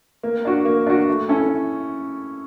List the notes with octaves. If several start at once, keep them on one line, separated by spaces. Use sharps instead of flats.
A#3
D4 F#4
A#3
D4 F#4
A3
C#4 E4 A4